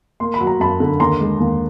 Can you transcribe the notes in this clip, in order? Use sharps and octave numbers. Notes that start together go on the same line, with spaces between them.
A#3 C6
B5
F#3
A#5
F#2 A5 B5
D3
D#2 A#5 C6
G#3
D#2